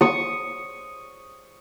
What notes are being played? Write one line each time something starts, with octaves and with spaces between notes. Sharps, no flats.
C#6 D#6